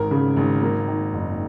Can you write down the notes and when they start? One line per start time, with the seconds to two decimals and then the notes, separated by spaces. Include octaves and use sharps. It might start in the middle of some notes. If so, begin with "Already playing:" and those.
Already playing: G#1 A#4
0.11 C#3
0.36 G#1
0.63 A#3
0.88 D#3
1.13 F#1